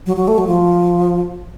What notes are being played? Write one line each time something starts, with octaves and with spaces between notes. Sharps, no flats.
F#3
F#3
A3
F#3
F3